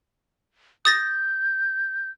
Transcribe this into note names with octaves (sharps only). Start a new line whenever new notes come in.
D#6 G6 A6 A#6